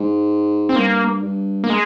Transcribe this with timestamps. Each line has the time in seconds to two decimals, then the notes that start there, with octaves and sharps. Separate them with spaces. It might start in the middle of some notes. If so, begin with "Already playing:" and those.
Already playing: G#2
0.69 C4
0.76 G2 A#3
1.23 G2
1.64 A#3
1.70 G#3